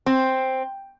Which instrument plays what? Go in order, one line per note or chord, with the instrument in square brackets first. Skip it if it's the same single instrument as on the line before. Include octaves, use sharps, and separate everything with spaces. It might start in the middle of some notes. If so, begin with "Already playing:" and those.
[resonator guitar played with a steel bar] C4